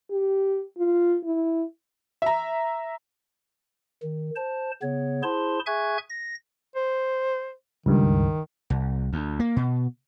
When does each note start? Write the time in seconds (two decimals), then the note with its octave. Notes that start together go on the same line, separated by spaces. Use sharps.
0.11 G4
0.78 F4
1.23 E4
2.22 E5 A#5
4.03 D#3
4.36 C5 A5
4.82 C#3 B3 C#5
5.23 E4 G#4 C5 A5 C6
5.66 G#4 E5 G#5 C#6 F#6 G#6
6.09 A#6
6.76 C5
7.86 C#2 G2 D#3
8.70 C2
9.13 D2
9.40 A#3
9.56 B2